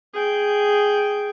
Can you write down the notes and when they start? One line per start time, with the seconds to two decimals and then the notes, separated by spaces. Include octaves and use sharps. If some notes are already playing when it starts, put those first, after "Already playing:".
0.13 G#4 G5